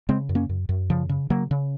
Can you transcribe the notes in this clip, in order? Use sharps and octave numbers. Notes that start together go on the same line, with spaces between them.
C#3 G#3 C4
F#2
A#3 C#4
F#2
F#2
C#3 F3
C#3
C#3 F#3 A#3
C#3